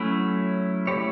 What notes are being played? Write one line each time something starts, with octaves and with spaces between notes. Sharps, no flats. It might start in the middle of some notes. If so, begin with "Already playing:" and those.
Already playing: F#3 A3 C#4 E4
A3 E4 G4 C#5